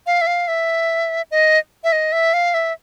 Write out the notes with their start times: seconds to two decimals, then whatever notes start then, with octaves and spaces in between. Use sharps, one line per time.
0.07 F5
0.21 E5
0.27 F5
0.48 E5
1.31 D#5
1.84 E5
1.92 D#5
2.12 E5
2.33 F5
2.54 E5